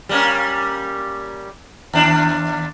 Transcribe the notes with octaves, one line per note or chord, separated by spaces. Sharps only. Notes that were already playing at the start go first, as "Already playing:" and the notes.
G3 A#3 C#4
D#2 D4